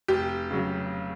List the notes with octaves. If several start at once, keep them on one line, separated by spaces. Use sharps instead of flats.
F1 G4
C#3 F#3